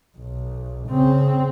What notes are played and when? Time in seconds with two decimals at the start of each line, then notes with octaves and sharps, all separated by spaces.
0.18 B1
0.88 C#3 C4